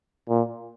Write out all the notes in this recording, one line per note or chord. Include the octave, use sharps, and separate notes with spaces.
A#2